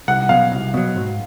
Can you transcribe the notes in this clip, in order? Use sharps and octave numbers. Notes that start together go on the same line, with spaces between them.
C2 F#5
B2 F#3 F5
C2
B2 F#3
G#2